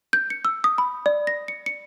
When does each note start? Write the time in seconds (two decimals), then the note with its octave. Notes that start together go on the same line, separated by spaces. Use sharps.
0.13 G6
0.30 C#7
0.45 E6
0.64 D#6
0.78 B5
1.06 D5
1.27 A#6
1.48 C#7
1.66 C#7